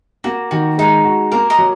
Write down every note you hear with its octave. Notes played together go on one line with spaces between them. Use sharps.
A#3 F#4
D#3 F#4
G#3 D#4
F#4
A#3 A#4
A#4 D#5
F#3